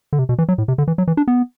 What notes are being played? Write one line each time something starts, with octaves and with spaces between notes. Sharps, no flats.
D3
C3
B2
E3
F#3
A2
C3
D3
E3
F#3
E3
D4
B3